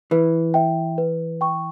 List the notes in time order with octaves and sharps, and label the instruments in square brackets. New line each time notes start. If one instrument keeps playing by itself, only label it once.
[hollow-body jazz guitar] E3 [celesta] B4
[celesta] E5 G5
B4
G5 C#6